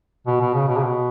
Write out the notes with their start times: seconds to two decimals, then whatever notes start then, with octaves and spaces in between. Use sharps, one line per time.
0.27 B2
0.41 B2
0.55 C#3
0.68 B2
0.77 C#3
0.83 B2